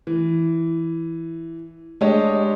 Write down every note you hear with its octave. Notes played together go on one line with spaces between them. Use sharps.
E3
G#3 D4 G4 C#5 D#5